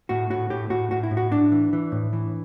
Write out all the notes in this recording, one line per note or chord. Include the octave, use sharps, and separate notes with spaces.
A2 F#4
A2 F#4
A2 G4
A2 F#4
A2 F#4
E4
A2
F#4
A2 D4
E3
E3
A2
E3